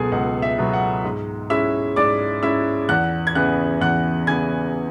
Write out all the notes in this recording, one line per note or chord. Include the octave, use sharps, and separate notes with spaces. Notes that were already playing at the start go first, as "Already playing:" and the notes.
Already playing: C#2 B2 F#3 B3 G#4 A4 G#5
C#2 F#5
E5
B2 F#3 B3
F#5
G#2
G#3 C#4 E4 E5 E6
G#2 D5 D6
G#3 C#4 E4 E5 E6
E2 F#5 F#6
G#6
C#3 E3 B3 F#5 F#6
E2 F#5 F#6
C#3 E3 B3 G#5 G#6